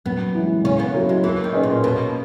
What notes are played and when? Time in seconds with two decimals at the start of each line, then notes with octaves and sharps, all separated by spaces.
0.06 F#2 B3
0.35 E3 G#3
0.64 C#3 C#4
0.79 B3
0.94 F#3 A#3 E4 A#4
1.09 G#3
1.23 E3 A#3
1.44 D#3
1.53 C#4 G#4 B4 D#5
1.63 A#2
1.83 B2 A#3